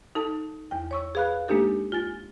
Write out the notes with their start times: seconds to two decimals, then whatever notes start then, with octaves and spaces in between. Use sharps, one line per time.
0.15 D#4 A4 A5
0.71 E2 G5
0.91 C#5 C#6 E6
1.15 G#4 B4 F5 B5 F#6
1.48 G#3 A#3 D4 D#4 G4 A4
1.92 F4 G#5 A6